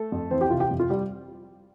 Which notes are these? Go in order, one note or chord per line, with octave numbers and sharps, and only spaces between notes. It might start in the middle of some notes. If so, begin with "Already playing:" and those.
Already playing: A3 A4
F2
E3 C4 C5
G4 G5
C3 F4 F5
G4 G5
F2
F4
G3 G4